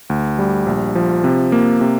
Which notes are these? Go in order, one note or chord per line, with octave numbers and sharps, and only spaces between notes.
D2
G3
A#1
F3
C3
A#3
C3